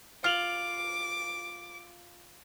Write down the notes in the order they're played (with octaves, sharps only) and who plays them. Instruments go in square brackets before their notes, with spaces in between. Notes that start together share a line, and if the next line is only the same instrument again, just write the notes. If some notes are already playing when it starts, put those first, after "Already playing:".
[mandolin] F4 [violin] D6 [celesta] F6 F7 F#7